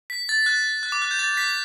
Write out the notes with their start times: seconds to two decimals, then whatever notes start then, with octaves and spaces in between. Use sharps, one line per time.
0.10 B6
0.29 A6
0.46 F#6
0.83 F#6
0.92 D6
1.02 F#6
1.11 G6
1.19 A6
1.37 B6